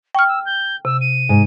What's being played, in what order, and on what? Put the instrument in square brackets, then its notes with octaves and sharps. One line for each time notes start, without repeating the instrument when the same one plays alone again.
[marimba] G5 F6 [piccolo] C#6
[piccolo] E6
G6
[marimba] C3 [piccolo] E6
[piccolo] D#7
[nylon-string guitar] G#2